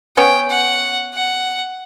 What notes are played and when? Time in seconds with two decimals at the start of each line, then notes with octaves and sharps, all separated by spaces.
0.17 B3 C#4 G5
0.50 F#5
1.14 F#5